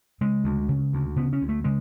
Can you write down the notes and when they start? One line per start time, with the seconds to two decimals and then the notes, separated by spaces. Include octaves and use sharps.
0.21 C#3 G#3
0.44 D2
0.69 C#3
0.93 D2
1.16 C#3 B3
1.33 C#4
1.41 D2
1.49 A3
1.64 C#3 G#3